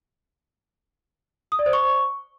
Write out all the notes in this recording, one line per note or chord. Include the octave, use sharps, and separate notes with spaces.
D#6
D5
C5
C#6